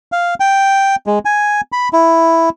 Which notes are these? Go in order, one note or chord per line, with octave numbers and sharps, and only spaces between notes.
F5
G5
G#3
G#5
B5
E4